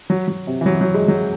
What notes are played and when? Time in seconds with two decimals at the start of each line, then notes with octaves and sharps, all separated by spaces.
0.10 F#3
0.28 F#3
0.47 C3
0.61 E3
0.66 F#3
0.81 F#3
0.94 G#3
1.08 F#3